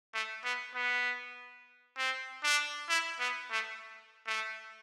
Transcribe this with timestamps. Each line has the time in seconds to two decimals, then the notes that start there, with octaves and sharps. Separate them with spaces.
0.14 A3
0.44 B3
0.75 B3
1.98 C4
2.44 D4
2.89 E4
3.19 B3
3.51 A3
4.27 A3